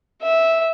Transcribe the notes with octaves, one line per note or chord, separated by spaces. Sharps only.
E5